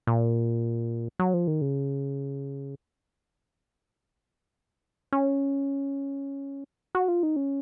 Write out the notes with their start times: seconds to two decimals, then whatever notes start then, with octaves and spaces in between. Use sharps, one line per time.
0.07 A#2
1.19 F#3
1.34 F3
1.47 D#3
1.61 C#3
5.12 C#4
6.95 F#4
7.08 F4
7.23 D#4
7.36 C#4